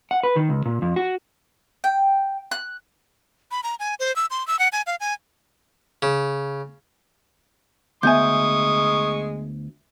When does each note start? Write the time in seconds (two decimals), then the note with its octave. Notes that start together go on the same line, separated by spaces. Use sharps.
0.11 F#5
0.23 B4
0.36 D#3
0.49 C#2
0.66 A#2
0.82 F2
0.96 F#4
1.84 G5
2.51 F#6
3.51 B5
3.63 A#5
3.79 G#5
4.00 C5
4.16 E6
4.30 C6
4.47 E6
4.59 F#5
4.72 G#5
4.87 F5
5.00 G#5
6.02 C#3
8.03 D2 G#3 B3 E5 G#5 C#6 D#6 G6